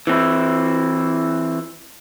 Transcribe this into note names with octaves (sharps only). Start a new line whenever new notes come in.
E3 C4 E4